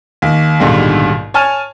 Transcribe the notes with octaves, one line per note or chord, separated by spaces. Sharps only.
D#2
A#1 D#2 G#2 B2 D3 G3
C#5 G#5 A5 F6